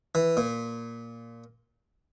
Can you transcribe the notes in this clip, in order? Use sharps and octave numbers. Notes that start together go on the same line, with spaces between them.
E3
A#2